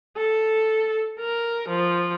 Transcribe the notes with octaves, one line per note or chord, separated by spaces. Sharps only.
A4
A#4
F3